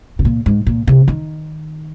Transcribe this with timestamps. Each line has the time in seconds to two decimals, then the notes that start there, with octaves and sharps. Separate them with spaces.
0.19 C3
0.25 A#2
0.46 G#2
0.67 A#2
0.87 C3
1.08 D#3